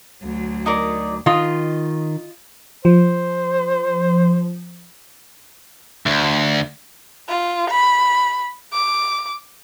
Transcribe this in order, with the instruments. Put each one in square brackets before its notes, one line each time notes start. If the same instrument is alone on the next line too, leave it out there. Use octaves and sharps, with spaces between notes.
[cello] D2 F#3
[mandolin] D#4 A#4 D5
[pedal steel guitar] D#3 C6 [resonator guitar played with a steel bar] F4 D#5
[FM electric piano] F3 [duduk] C5
[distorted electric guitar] D2
[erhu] F4
B5
D6